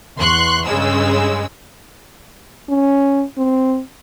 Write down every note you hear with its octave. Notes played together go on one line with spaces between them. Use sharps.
E2 C6 C#6 F#6
G2 C#3 G#3 E6
C#4
C4